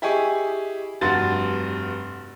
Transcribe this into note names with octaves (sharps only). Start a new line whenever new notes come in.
E4 G4 G#4 D#5 G#5 C#6
F1 G2 F#4 C6 A6